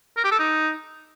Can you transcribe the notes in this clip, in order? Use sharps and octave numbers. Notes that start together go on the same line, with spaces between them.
A#4
G4
A4
D#4